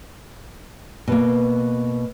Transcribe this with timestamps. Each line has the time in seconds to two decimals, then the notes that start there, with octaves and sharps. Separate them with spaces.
1.08 B2 A#3